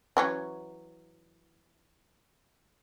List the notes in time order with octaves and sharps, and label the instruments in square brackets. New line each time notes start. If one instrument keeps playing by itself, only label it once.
[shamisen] E3 F#3 C#4